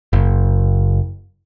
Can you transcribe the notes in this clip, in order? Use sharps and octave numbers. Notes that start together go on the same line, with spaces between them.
F#1